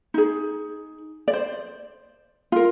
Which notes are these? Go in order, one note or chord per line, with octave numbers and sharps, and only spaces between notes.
D#4 G#4
D5
C5
F4 A#4